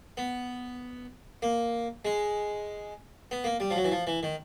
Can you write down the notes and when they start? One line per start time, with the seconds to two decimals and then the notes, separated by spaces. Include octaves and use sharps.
0.17 B3
1.42 A#3
2.05 G#3
3.31 B3
3.44 A#3
3.60 G3
3.71 F3
3.76 F#3
3.84 E3
3.92 F3
4.07 E3
4.23 D#3